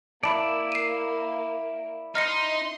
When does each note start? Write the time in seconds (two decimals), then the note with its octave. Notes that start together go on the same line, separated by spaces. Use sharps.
0.23 A#3 E4 D5 A5 B5 D6
0.72 C7 D#7
2.15 D#4 C6 F6 A#6 C#7